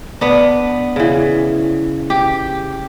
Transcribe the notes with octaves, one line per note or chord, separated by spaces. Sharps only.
B3 D4
C#3 E3
G4